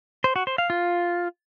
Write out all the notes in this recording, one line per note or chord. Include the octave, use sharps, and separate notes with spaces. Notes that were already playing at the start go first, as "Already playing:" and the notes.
C5
F#4
C5
F5
F4